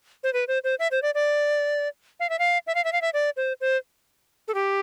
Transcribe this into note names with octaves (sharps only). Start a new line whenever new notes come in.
C5
B4
C5
C5
E5
C5
D5
D5
F5
E5
F5
E5
F5
E5
F5
E5
D5
C5
C5
A4
G4